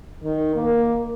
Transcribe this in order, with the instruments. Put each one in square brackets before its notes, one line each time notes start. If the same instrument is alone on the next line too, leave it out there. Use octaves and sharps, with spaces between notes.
[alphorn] D#3
A#3